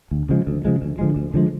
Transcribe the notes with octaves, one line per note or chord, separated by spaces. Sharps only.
D2
C#3 F3 G#3
D2
C#3 F3 G#3
D2
D3 F3 G#3
D2
D3 F3 G#3